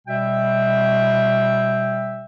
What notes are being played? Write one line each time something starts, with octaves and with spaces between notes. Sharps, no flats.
B2 G3 E5 G5